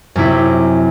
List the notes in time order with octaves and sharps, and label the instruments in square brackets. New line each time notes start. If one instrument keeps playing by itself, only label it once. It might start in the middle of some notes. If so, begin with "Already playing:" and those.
[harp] F#2 C3 E4